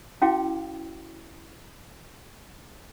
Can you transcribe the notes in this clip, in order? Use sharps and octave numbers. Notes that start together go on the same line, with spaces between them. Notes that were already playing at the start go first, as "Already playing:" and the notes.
C#4 E4 F#4 F5 G5 D6